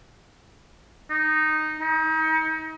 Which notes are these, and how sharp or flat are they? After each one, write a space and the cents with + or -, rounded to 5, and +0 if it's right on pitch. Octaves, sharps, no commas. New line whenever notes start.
D#4 -5
D#4 +35